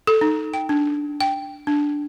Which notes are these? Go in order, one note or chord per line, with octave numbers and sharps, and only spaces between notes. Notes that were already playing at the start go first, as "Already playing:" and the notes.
A4
D#4
G5
D4
G5
D4